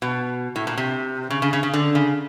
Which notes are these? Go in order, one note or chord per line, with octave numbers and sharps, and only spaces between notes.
B2
A2
A#2
C3
C#3
C#3
C#3
C#3
D3
C#3